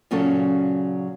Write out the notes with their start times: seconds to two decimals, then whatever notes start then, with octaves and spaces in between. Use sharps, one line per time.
0.11 A#2 C#3 F#3 C#4 A4